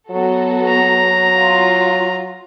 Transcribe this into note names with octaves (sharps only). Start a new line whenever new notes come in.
F#3 B3 F#4 A4
A#5
F4